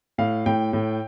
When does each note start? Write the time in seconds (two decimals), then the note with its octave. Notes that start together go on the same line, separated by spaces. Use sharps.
0.18 A2 F5
0.46 A2 G5
0.73 A2